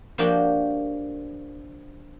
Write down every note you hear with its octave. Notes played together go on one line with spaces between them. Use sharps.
F3 A#3 D4 F#4 G4